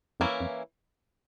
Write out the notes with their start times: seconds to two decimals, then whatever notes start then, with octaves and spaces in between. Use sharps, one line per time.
0.20 F2 E3 A#3 C#4 E4
0.40 F2